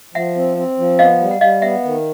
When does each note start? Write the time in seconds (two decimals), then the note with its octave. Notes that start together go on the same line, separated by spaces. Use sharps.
0.14 F3 E5 F#5
0.36 C4
0.57 C4
0.78 F3
0.99 B3 D#5 F5
1.20 G3
1.31 F#5
1.41 G3 D#5 F5
1.62 B3 E5 F#5
1.84 D#3